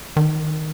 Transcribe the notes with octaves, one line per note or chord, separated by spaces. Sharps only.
D#3